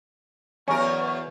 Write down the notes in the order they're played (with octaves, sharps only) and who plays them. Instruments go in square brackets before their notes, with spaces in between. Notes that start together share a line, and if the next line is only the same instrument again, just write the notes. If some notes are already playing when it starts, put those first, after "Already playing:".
[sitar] E2 A#4 [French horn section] F#3 B3 [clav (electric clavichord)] C#4 [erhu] C#5